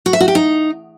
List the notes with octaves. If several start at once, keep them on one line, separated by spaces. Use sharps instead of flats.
F#4
E5
F#4
G4
D#4